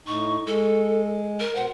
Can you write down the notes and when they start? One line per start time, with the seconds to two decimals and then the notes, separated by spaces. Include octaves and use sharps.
0.07 A2 D#4 C#6
0.46 G#3 A4
1.40 A#4
1.55 B2 C5 F#5